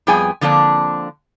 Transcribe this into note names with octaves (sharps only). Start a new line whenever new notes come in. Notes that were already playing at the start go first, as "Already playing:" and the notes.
F2 G3 B3 G#4 G5 G#5
D3 F3 A#3 C4 D4